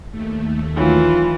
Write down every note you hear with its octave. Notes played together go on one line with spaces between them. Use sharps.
D#2 A3
D#3 E3 F#3 F4